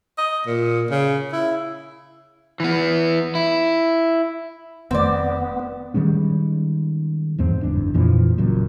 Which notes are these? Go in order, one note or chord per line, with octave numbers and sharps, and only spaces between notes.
D#5
A#2
C#3
E4
E3 B3
E4
F1 D#3 A3 B3 C4 D5
D#3 G3 G#3 C#4
E2 G#2 C4
F#1 E2 D4
F2 A#2 E3 F3
F#1 F#2 A#2